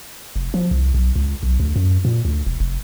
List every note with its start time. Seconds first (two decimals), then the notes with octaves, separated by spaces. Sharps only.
0.36 F1
0.54 F3
0.71 C2
0.94 B1
1.16 C#2
1.43 B1
1.60 D2
1.76 F#2
2.05 A#2
2.25 D2
2.46 E1
2.60 F1